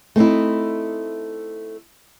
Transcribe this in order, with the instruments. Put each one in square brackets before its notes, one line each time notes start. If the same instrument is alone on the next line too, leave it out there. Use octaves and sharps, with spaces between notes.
[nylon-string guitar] A3 C4 D#4 E4